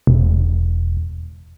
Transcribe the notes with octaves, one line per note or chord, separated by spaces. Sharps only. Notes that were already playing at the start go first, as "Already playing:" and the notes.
E1